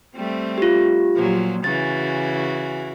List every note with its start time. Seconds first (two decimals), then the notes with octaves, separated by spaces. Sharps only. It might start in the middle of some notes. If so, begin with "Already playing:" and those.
0.16 G3 A3 C4
0.58 F4 G4
1.15 A#2 F3 F#3
1.64 C#3 E3 F#4 A6